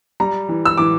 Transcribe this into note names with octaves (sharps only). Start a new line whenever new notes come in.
G3 A#5
E3
E6
E3 D6